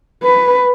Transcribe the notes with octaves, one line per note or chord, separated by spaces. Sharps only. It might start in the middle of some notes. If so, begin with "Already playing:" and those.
B4